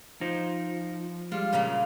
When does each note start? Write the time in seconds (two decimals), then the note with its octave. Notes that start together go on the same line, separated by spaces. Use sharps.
0.21 F3 D#4 C5
1.32 G3 G#3 F4
1.53 A#2 C#3 A#3